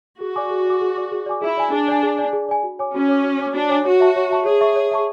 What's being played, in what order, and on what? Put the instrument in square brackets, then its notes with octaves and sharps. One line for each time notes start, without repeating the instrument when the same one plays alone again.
[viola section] F#4 [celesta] G#4
[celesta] D5 G#5 D6
G#4
D5 G#5 D6
G#4
D5 G#5 D6
G#4
D5 G#5 D6
[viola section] E4 [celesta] G#4
[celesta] D5 G#5
[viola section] D4 [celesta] G#4
[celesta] D5 G#5
G#4
D5 G#5
G#4
D5 G#5
F#4
C#5 G#5 D6
[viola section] C#4 [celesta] F#4
[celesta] C#5 G#5 D6
F#4
C#5 G#5 D6
[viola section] D4 [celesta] F#4
[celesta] C#5 G#5 D6
[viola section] F#4 [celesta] C#5
[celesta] E5 A5 C#6
C#5
E5 A5 C#6
[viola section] G#4 [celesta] C#5
[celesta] E5 A5 C#6
C#5
E5 A5 C#6